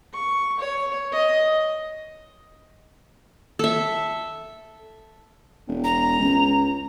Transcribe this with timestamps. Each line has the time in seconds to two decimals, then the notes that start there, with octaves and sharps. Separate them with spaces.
0.14 C#6
0.59 C#5
1.12 D#5
3.59 A4 E5
5.68 E1
5.84 A#5
6.19 C#2